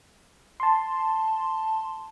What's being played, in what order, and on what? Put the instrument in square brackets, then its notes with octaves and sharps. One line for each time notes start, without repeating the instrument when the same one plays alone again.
[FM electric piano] A5 C6